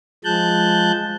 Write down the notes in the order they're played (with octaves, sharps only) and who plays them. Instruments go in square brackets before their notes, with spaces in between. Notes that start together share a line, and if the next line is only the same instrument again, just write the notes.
[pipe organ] F3 G#3 A5 F#6 G6